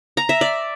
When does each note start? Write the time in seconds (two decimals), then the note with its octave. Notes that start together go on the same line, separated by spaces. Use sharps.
0.17 A#5
0.29 E5
0.41 D5